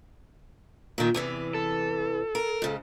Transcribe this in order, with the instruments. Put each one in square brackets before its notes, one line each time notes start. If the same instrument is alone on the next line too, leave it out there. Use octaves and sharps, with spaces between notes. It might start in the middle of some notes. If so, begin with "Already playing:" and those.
[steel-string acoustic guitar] A#2 D#3
E2 C3 E3
[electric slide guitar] A4
[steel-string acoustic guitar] A#4
G#2 C#3